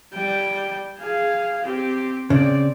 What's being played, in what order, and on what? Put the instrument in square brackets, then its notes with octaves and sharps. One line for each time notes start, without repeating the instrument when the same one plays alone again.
[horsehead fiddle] G3 G5
G#4 F5
C4 G4
[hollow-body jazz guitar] C#3 [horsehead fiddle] C4 D5